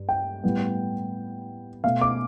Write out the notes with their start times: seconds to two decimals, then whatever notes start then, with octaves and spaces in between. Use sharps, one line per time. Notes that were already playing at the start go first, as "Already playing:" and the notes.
Already playing: G2
0.09 G5
0.44 A2 G3 B3
1.84 B2 A3 F5
2.01 D6